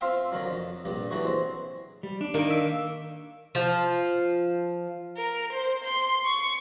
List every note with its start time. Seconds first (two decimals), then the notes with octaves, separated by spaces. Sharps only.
0.01 C4 F4 C5 E5 F5 G5
0.32 D3 D#3 F#3
0.46 F2
0.85 A#1 G2 G3
1.11 D3 E3 F#3 G#3 F#4
1.24 C4 C5
2.03 G3
2.21 D4
2.34 D#3 A#3
2.50 E5
3.55 F3
5.17 A#4
5.52 C5
5.84 C6
6.25 C#6